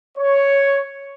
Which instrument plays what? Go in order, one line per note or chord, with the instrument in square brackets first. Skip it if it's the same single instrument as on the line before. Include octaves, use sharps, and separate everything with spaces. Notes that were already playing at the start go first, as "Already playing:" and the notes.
[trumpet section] C#5